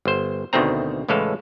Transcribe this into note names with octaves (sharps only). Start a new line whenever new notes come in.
G1 C5
D2 B2 D#3 A3 C4 A#5
C#2 A2 E3 G#3 A4 F5